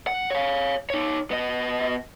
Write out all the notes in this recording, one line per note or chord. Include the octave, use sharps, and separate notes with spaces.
F#5
C#5 F5
D#4 C#5
B3 D#5